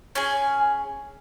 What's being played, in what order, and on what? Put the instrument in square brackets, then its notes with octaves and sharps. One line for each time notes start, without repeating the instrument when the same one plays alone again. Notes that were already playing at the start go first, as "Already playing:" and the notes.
[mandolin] C#4 G#4 G#5